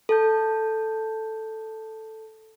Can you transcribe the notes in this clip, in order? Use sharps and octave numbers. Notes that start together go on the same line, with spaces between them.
A4 A5 G6